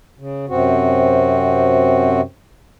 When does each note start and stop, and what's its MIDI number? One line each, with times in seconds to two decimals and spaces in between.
0.19 0.46 49
0.49 2.21 42
0.49 2.21 48
0.49 2.21 60
0.49 2.21 66